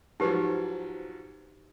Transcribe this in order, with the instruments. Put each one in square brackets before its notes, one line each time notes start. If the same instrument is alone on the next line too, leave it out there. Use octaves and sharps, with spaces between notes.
[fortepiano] G#2 F3 F#3 [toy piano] D#4 G4 B4